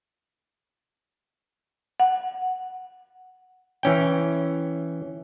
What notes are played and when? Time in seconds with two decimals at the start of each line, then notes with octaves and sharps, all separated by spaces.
2.00 F#5
3.83 E3 C#4 G5